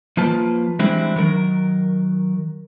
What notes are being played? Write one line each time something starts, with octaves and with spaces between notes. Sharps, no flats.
F3 A#3 F4 B4 A5
E3 G3 G#3 C4 D4 E4
D#3 F#3 A#4